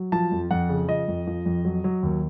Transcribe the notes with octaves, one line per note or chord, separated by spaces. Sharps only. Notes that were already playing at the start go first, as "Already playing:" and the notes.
Already playing: F#3
F3 A5
F2
F2 F#5
C#3
F3 D#5
F2
F3
F2
F#3
F#3
D#2